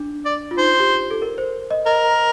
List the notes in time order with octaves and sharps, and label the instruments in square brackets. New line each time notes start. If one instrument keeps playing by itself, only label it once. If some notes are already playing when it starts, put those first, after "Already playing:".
Already playing: [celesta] D4
[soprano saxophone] D5
[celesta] F4
[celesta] D#4 [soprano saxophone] C5
[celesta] G4
A4
A#4
C5
D#5
[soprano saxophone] A#4 [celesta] D#5